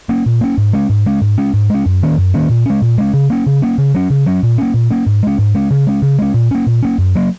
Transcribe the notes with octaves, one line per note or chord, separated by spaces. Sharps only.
A#3 C#4
A#2
A#3 C#4
G#2
G#3 C#4
G#2
G#3 C#4
G#2
G#3 C#4
G#2
G#3 C#4
F#2
D#3 A#3 C#4
F#2
D#3 A#3 C#4
A#2
G#3 C#4
A#2
G#3 C#4
C#3
A#3 C#4
C#3
A#3 C#4
C#3
F#3 C#4
C#3
F#3 C#4
A#2
A#3 C#4
A#2
A#3 C#4
G#2
G#3 C#4
G#2
G#3 C#4
C#3
G#3 C#4
C#3
G#3 C#4
A#2
A#3 C#4
A#2
A#3 C#4
F#2
F#3 A#3